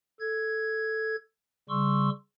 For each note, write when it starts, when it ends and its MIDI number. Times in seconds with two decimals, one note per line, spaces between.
0.20 1.16 69
0.20 1.16 92
1.69 2.10 49
1.69 2.10 55
1.69 2.10 84
1.69 2.10 85
1.69 2.10 88